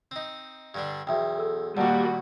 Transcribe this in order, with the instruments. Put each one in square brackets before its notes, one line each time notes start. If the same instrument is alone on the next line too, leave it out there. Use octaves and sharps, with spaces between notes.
[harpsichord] C4 D#4
G2 D3 D4
[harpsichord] B1 E2 [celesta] E5 G5
[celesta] A4 E6
[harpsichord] D#2 A#2 [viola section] G3 A#3 F#4 [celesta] D5 F#5 A5